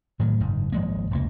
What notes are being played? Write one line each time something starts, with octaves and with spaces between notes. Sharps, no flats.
A2 D#3 F#3
F#1 G#2
G#1 F3 G#3 A#3
F1 C#2 A#3